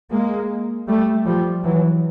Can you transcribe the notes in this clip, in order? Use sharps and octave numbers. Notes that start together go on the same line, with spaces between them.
G#3 A#3
G3 A3
F3 G3
E3 F#3